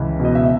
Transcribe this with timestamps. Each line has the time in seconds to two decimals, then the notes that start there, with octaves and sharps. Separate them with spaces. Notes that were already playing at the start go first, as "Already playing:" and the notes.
Already playing: C#2 E3
0.19 B2
0.25 D#5
0.35 E5